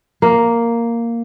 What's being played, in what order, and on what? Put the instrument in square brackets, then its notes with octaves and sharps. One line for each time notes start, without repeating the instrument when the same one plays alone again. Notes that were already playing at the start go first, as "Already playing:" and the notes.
[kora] A#3